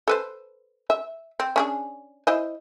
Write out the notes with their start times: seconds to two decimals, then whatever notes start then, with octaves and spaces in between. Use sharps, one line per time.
0.08 A4 B4 C5
0.90 E5
1.40 C4
1.56 C#4 D4 G#4
2.27 E4 C5 D#5